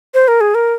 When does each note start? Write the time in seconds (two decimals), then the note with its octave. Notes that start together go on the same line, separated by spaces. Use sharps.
0.14 C5
0.28 A#4
0.41 G#4
0.55 A#4